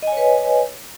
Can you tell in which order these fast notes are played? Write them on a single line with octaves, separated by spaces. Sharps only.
D#5 G#5 C#5 B4